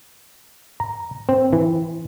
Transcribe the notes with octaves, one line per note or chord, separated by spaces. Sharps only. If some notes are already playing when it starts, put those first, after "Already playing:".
A#5
C4
E3